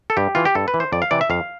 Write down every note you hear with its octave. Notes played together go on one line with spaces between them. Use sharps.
A4
G2 G4
E3 F4
G4
G2 A4
B4
E3
C5
F2 D5
F5
C3 E3 D5
E5
F2 F5